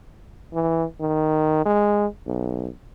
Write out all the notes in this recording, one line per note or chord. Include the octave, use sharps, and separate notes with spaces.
E3
D#3
G#3
B1